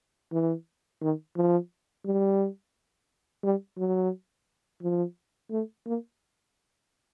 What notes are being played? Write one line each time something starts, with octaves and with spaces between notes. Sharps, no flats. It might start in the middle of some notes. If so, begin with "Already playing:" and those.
E3
D#3
F3
G3
G3
F#3
F3
A3
A#3